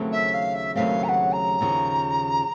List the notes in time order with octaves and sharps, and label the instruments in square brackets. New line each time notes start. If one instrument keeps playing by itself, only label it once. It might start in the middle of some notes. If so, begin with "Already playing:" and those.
Already playing: [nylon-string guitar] D#2 C#3 F#3 A3 C4
[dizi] E5
F5
E5
[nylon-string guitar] D#2 C#3 F#3 A3 C4 [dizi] F5
[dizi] A#5
F#5
A#5
[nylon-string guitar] D#2 C#3 F3